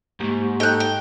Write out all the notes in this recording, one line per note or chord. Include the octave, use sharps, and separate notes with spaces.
C2 G#2 A#3 G4 C#6
D#4 A4 G5 F#6
G5